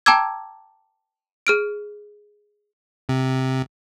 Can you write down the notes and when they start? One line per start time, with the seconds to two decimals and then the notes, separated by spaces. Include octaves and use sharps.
0.06 G5 A5 A#5 D6 E6 G#6
1.47 G#4 F6 D7
3.09 C3